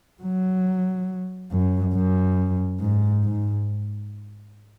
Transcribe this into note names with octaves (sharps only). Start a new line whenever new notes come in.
F#3
F#2
F#2
G#2
G#2